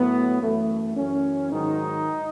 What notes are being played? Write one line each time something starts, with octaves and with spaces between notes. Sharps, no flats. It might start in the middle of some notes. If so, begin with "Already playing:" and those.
Already playing: A2 F#3 B3
F#2 E3 A3
F#2 E3 C#4
G#2 D#3 F#3 D#4